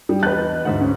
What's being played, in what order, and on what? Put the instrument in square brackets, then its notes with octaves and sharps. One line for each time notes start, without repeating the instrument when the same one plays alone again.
[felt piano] G3
[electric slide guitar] E2 D#5 A5 [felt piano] B4 F#6
[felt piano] D2 G#2 [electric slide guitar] B4 C5 F#5
[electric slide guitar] C#4